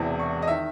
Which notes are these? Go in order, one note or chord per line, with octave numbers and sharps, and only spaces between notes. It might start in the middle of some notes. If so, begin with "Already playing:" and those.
Already playing: E1 E2 C3 E3
C#6
D#5
D#3 E5